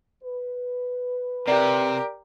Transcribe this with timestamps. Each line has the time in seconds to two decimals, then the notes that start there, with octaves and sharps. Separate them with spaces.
0.23 B4
1.47 C3 G4 A#4 D5